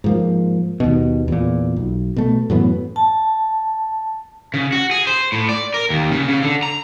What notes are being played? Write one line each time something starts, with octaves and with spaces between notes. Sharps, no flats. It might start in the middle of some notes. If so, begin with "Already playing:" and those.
G#2 F3 A#3
D#2 B2
E2 A#2
B1
B2 A3
F#2 A2 E3 B3
A5
C#3
F#4
G#4
C5
A2
D5
A#4
D#2
C#3
C#3
D3
A#5